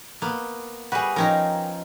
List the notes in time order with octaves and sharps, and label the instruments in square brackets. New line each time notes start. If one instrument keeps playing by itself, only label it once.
[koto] A#3 B3
[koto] G3 B4 [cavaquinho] F#4 G#4
[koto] F3 C#4 D#4 [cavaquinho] A#4 G5 A#5